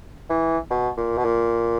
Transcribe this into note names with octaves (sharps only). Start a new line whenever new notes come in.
E3
B2
A#2
B2
A#2